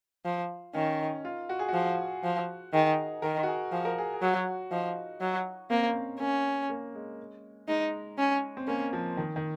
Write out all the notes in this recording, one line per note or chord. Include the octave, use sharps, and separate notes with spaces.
F3
D#3 C#4
F4
F#4
G#4
F3 F#4
F3
D#3 G#4
D#3 A#4
F#4
G#4
F3 G#4
A#4
G#4
G#4
F#3 F#4
F3 D#4
F#3
A#3 C4
C#4
C4
A#3 C#4
A#3
G#3
G#3 D#4
C#4
C4
A#3 C#4
F3
D#3
D#3